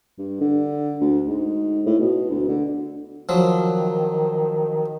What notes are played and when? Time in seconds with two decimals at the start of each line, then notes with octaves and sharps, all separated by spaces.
0.18 G2
0.41 D3
1.01 D2
1.27 G#2
1.86 A2
1.99 B2
2.30 D2
2.49 D3
3.29 D#3 F3 F#3